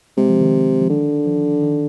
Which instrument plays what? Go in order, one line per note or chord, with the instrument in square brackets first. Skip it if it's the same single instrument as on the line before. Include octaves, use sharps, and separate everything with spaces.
[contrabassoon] C3 [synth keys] G#3
[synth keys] F3
D#3
D#3
F3
[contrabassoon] D3 [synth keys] D#3
[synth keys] F3
D#3